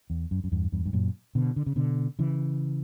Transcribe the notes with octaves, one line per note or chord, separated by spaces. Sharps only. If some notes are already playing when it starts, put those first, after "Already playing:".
E2
F#2
F#2
E2 G2
E2 G2
G2
F#2 A#2
B2 D3
D3
C#3
B2 D3
C#3 E3